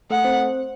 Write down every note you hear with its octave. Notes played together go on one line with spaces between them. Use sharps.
A3 A4 F#5
C4 C5